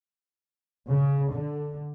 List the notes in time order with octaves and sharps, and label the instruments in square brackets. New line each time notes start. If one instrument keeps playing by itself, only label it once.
[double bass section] C#3
D3